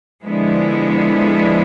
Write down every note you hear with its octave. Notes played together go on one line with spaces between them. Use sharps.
D3 F3 G#3 B3 E4